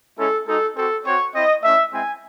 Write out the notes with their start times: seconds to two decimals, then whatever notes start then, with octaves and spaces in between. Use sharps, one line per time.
0.17 G#3 C#4 E4 A4
0.47 G#3 D#4 F#4 A4
0.75 C4 F#4 A4
1.05 C4 F#4 C#5
1.34 C4 E4 D#5
1.62 A3 C#4 E4 E5
1.92 G#3 C4 E4 G#5